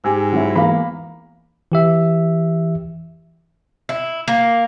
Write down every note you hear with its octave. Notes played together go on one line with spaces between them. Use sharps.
G#2 G4 G#5 E6
F#3 E4
E2 A#3 F5 A#5 B5
E3 G4 E5
E4
A#3